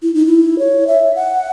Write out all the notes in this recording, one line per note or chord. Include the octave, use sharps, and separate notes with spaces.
E4
D#4
E4
C#5
E5
F#5